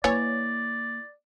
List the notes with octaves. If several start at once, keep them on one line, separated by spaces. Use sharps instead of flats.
E3 A#3 C#5 D5